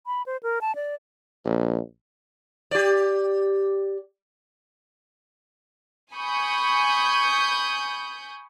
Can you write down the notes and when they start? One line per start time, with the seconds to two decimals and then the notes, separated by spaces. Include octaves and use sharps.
0.07 B5
0.26 C5
0.43 A#4
0.61 A5
0.75 D5
1.45 A#1
2.71 G4 D5
6.13 G#5 B5 C#6 D#6 G6